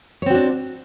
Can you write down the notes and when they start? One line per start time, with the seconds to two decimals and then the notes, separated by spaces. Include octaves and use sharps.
0.22 C#5
0.26 C4
0.30 F#4
0.34 D4